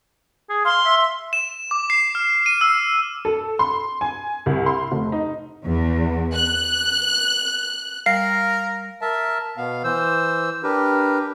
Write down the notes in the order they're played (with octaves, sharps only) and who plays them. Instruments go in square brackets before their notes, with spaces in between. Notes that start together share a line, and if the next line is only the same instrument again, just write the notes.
[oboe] G#4
[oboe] F5 [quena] C6
[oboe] E5
[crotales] E7
D6
C7
F6
D#7
E6
[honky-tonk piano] A4
C6
G#5
C2
C6
F1
D#4
[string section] E2
F#6
[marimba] G3 [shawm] A#4 [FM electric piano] F5 [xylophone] C7
[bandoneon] A#4 E5 A5
B2 B3 F5
E3 C5 E6
D4 G4 A#4 B4